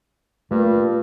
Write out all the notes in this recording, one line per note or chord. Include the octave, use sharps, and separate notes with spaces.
G2 A#2 A3